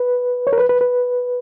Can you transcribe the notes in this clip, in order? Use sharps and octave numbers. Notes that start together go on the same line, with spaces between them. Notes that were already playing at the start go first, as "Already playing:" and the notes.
Already playing: B4
C#5
A#4
B4
B4
B4